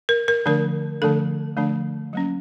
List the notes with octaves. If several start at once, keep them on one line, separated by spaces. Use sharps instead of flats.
A#4
A#4
D3 F3 A3 D4 A#4
D3 F3 A3 D4 A4
D3 F3 A3 D4
F#3 A#3 C#4